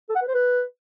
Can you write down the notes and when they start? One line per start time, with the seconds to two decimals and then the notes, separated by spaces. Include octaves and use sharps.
0.09 A4
0.16 F#5
0.22 B4
0.28 C5
0.34 B4